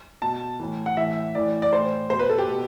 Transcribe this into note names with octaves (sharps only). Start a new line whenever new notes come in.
B2 A5
A2 E3
F#5
A2 E3 E5
A2 E3 D5
D5
A2 E3 C5
B2 C5
B4
A4
G4
B2